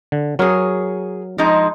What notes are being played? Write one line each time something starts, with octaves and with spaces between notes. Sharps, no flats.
D3
F#3 G#4 A#4 C#5
F3 G#3 D#4